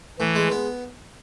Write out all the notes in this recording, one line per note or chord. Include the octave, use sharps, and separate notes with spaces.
A2 E3
G#3
B3